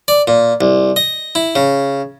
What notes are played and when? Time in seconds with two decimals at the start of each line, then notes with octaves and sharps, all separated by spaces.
0.08 D5
0.28 A#2
0.61 C2
0.96 D#5
1.35 E4
1.56 C#3